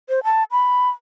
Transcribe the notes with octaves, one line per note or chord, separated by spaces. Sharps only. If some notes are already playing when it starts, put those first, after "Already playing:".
C5
A5
B5